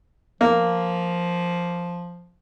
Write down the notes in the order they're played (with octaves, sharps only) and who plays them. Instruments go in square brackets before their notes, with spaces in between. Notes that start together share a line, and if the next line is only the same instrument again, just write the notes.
[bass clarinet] F3 [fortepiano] A#3